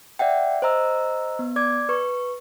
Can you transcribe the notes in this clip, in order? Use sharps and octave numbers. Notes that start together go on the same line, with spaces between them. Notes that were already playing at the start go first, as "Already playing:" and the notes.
D5 E5 F#5 G5
C5 D#5 A#5 E6
B3
D5 D6 G#6
B4 C#6